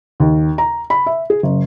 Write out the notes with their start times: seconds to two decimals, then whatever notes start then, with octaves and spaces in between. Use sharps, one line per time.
0.20 D#2
0.58 A#5
0.90 B5
1.06 E5
1.30 G#4
1.43 F#1